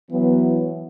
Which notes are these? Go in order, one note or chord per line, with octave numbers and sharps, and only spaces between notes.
E3 F#3 B3